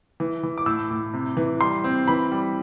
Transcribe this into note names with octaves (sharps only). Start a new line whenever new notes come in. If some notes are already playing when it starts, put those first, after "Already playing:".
E3
E3
D6
A2 E6
A2
C3
E3
G3 C6
C4
E3 B5
G3